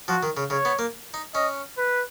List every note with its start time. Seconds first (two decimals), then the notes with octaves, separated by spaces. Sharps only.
0.08 F3 F#4
0.23 D#3
0.37 C#3
0.50 C#3 C#5
0.65 B3
0.79 A#3
1.14 D#4
1.34 C#4 D#5
1.77 B4